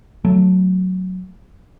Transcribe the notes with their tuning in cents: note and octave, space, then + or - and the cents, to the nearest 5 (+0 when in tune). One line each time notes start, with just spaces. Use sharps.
F#3 +0 A3 +0